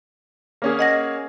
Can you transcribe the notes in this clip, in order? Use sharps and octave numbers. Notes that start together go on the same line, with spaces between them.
A#3 C#4 G#4
D#5 F#5 A#6